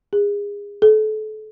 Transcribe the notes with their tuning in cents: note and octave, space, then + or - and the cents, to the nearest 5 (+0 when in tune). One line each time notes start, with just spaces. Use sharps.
G#4 -30
A4 -30